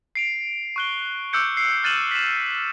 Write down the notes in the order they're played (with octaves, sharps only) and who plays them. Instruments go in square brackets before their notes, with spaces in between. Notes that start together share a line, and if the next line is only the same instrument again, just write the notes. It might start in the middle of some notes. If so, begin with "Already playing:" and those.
[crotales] C7 D7 F7
C#6 F#6 G7
D6 E6 F#6 G6 C#7 D7
C7
F6 F#6 A6 D#7 E7 F#7
B6 E7